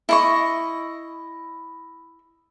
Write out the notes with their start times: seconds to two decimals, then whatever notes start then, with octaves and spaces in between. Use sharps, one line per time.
0.09 E4 D#5 C#6